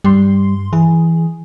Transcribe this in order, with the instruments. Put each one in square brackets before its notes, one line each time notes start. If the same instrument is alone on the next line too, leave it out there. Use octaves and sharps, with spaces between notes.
[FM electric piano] G2 C6 [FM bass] G3
[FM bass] E3 [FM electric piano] G#4